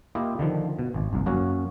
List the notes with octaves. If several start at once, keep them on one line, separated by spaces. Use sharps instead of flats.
A#3 E4 F4 G4 D#5
D3 D#3 F3
B2
G#1
G1 C2
F#2 A#3 C#4 F#4 G#5